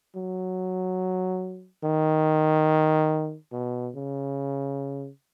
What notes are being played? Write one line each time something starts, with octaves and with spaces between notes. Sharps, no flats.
F#3
D#3
B2
C#3